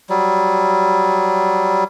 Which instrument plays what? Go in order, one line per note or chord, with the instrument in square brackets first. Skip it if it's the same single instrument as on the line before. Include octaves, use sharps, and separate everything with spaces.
[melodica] F#3 G3